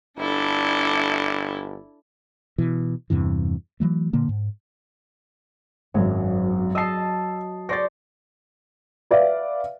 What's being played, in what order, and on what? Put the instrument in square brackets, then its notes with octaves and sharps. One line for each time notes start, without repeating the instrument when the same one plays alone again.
[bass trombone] G1 [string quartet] D4 E4 A4
[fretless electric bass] B2 E3
E2 G2 C3 E3
E3 F#3 A3
A#2 D3 A#3
G#2
[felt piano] G#1 F#2 [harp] F#3
[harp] D#5 A5 [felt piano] E6 C7
[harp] C5 D5 C#6 [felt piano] A6 A#6
[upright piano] B4 D5 E5 F5